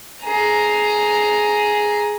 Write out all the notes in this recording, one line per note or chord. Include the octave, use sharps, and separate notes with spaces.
G#4 A#5